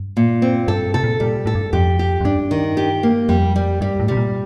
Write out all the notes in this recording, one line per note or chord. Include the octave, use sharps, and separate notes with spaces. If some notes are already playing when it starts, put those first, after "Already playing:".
Already playing: G2
A#2
C4
G2 A4
C3 A4
A#2
A#2 G3
A2 A4
G2
F2 G4
G4
F2
G2 D4
D#3
G4
A#3
F2 G3
G3
G2 G3
A2
C3 G3
A#2